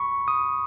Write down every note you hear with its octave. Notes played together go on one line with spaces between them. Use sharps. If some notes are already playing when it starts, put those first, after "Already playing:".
Already playing: B5 C#6
D#6